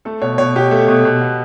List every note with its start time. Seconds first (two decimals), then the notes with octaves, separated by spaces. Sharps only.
0.05 A3 A4
0.22 B2 C#5
0.38 B2 C#5
0.55 B2 G4
0.71 A3
0.88 B2
1.05 B2
1.21 B3